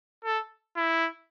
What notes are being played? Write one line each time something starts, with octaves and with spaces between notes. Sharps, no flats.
A4
E4